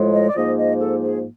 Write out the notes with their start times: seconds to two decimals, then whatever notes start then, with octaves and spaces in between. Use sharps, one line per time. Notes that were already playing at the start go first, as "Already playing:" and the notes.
Already playing: A2 F3 G#3
0.13 D#5
0.29 D5
0.35 G#2 F3 A#3 D#5
0.57 D#5
0.80 A4
1.02 G#4